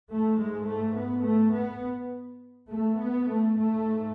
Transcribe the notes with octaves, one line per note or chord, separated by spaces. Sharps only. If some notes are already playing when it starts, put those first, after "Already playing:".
G#2 A3
G#3
A3
B3
A3
B3
A3
B3
A3
G#2 A3